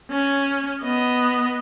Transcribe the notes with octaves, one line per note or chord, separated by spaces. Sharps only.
C#4
B3 D#5